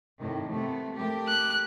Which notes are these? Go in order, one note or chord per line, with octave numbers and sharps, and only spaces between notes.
A2 C3 D#3
C3 A3 B3
A3 G4 A#4
F#6